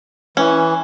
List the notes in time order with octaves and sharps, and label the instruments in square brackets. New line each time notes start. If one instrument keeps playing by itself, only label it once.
[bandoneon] E3 [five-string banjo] C#4